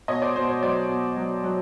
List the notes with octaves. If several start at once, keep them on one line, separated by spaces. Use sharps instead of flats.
B2 C#5 D#5
C5 D5
B2 C5
C#5
F#3 C5 D5
B2
F#3
F#3